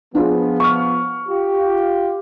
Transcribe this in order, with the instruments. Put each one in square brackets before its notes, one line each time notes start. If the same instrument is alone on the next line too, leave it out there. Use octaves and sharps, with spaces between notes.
[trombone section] F3 B3 [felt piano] D4 F4 G#4
[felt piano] C#6 F6
[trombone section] F4 G4